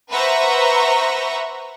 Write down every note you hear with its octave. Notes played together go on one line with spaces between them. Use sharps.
B4 C5 E5 F#5 A#5 C#6